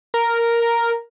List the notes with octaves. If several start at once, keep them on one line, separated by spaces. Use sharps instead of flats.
A#4